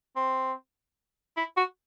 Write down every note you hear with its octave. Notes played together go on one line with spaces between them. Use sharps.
C4
E4
F#4